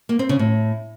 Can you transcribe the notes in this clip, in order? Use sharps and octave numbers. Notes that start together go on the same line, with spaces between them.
A#3
C4
C#3
A2